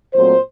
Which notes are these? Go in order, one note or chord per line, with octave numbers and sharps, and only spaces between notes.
A#2 F#3 A3 C4 C5